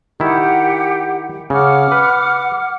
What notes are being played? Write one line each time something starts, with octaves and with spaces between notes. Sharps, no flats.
D#3 E4 G4 F#5
C#3 F#5 D6 F6
B4